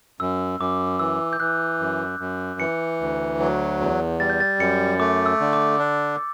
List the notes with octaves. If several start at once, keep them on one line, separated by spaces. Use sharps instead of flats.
F#2 E6
F#2 D6
E3 E6
G6
E3 F#6
F#2
F#2
E3 C#7
D2
F#3
E2
G3 A6
G6
A6
F#2 C#7
A3 D6
E6
D3
D6
D4